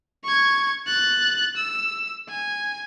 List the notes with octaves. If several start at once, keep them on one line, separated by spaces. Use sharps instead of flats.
C#6 G#6
F#6 A6
E6
G#5